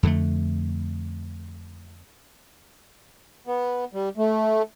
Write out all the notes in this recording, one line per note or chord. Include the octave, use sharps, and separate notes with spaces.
F2 D3 A3
B3
G3
A3